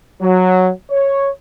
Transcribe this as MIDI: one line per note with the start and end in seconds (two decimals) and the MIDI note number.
0.22 0.72 54
0.91 1.30 73